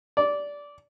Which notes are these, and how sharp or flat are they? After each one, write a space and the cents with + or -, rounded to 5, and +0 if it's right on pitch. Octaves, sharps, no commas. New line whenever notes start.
D5 -15